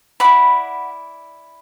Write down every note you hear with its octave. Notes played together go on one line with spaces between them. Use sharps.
E4 D5 F#5 B5